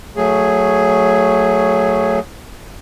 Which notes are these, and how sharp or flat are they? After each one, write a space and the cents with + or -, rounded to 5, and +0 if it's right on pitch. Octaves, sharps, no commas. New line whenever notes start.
F#3 +0 A3 +20 G#4 +0